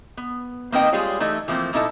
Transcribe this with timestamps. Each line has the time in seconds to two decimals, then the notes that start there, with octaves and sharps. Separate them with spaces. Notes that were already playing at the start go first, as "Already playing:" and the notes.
0.17 B3
0.72 A#3 C4 D#4 B4 D#5 G5
0.92 G3 G#3 F4 G#4 C#5
1.20 E3 A3 D#4 E4
1.48 E3 F3 A3 A#3 C4
1.73 A#2 A3 D#4 E4 A4 A5